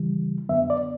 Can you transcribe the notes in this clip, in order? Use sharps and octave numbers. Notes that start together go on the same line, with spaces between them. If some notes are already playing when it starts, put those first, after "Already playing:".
Already playing: C#3 E3 G3
F#2 D3 F#3 B3 E5
D5